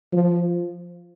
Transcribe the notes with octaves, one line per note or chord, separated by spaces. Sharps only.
F3